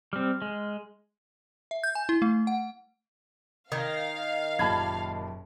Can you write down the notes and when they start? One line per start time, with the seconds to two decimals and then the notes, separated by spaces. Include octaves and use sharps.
0.13 G3 C4 F6
0.42 G#3
1.71 E5
1.83 G6
1.95 G#5
2.09 E4
2.22 A3
2.47 F#5
3.72 D#3 D#4 F5 G#6
4.59 F#1 A#2 G4 A5 B5 G#6